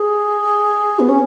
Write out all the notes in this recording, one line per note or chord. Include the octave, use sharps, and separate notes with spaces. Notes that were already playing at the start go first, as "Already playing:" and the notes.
Already playing: G#4
B3
C#4